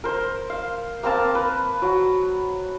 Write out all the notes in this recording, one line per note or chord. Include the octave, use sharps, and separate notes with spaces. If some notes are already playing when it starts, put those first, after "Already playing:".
A#4 C5
F5
A#3 C4 A#4 A5
B4
F#3